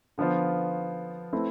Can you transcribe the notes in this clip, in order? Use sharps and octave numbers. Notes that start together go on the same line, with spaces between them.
D3 F3 B3 F4 C5
A3 C4 E4 B4